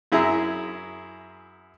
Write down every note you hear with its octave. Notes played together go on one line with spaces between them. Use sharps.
F#2 E4 G#4 E5 A#5